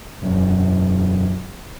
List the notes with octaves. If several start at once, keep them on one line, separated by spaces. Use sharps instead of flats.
E1 F#2